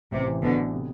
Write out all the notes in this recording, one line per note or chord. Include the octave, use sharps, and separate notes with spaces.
A1 C3
E3
A1 B2 D3
B3
C3